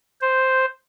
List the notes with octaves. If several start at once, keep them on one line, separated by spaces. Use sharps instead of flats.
C5